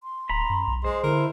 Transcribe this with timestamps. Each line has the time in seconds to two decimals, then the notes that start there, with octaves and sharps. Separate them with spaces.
0.03 C6
0.29 D1 A#5 B5
0.49 F#2
0.67 B1
0.84 G#3 C5
1.03 D3 E4 A#4